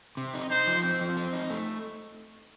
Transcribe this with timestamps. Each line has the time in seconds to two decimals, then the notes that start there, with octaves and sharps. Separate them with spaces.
0.17 C3
0.34 D#4
0.50 D#4 C5
0.67 F3
0.84 C4
1.01 F3
1.17 C4
1.33 D#4
1.50 A3